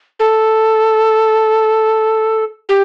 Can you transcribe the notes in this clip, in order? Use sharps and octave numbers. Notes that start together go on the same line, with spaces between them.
A4
G4